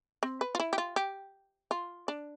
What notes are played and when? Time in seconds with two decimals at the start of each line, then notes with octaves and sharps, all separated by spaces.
0.23 C4
0.41 B4
0.55 F4
0.60 E4
0.73 G4
0.78 F4
0.96 G4
1.71 F4
2.08 D4